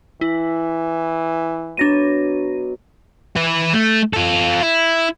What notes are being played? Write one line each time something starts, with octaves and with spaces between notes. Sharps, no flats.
E3 E4
B2 F#3 D4 D6 A#6 D#7
E3 B4
A3
F4 A4
E4